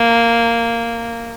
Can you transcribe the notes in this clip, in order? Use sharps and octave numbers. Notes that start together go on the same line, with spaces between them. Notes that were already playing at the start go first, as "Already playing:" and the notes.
Already playing: A#3